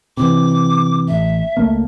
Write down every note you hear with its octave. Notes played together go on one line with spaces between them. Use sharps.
C3 E3 D6
A1 E5
C#2 A3 A#3